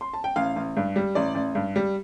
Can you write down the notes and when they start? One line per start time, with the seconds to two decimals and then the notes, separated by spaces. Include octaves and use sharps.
0.01 C6
0.13 A5
0.24 G5
0.36 A1 F5
0.56 A1
0.77 G2
0.96 G3
1.15 A1 D5
1.35 A1
1.55 G2
1.76 G3